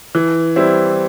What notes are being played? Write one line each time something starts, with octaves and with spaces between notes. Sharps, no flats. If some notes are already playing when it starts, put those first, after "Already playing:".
E3
G3 C4 E4